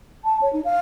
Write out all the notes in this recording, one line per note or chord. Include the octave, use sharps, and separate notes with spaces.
A5
C#5
D#4
F5